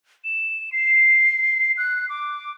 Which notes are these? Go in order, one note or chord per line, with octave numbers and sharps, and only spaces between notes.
E7
C7
F#6
D6